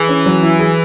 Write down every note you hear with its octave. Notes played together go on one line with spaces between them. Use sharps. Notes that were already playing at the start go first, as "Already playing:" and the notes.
Already playing: E3 G#4
C#4
F#3
E4
G#4